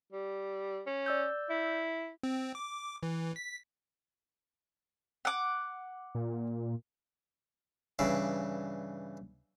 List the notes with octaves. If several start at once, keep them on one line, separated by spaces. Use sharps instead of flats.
G3
C#4
D5 E6 G6
E4
C4
D6
E3
B6
F#5 D6
A#2
G2 C#3 E3 D5